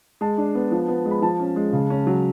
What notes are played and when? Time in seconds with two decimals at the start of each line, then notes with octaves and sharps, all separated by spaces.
0.21 G#3 A5
0.38 D4
0.55 B3
0.71 F3
0.88 B3
1.06 G#3
1.11 B5
1.22 F3 A5
1.40 C#4
1.56 G#3
1.72 C#3
1.90 C#4
2.07 F#3